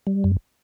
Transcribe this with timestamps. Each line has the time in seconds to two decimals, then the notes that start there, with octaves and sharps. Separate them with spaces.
0.07 G3
0.24 F#2